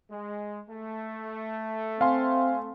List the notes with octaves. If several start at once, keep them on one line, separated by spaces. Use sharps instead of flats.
G#3
A3
C4 F5 G#5 C6